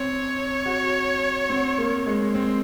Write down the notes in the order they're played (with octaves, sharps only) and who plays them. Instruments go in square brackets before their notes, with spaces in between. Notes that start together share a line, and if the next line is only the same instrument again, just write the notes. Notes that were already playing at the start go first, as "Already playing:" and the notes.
Already playing: [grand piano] C4 [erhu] C#5
[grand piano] F#4
C4
A#3
G#3
C4